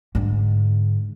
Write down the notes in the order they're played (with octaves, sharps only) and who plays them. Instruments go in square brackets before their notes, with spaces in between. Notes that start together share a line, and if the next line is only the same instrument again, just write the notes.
[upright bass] G#2 D3